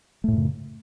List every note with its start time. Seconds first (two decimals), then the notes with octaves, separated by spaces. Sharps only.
0.24 A3
0.28 A2
0.32 F#2
0.37 C#3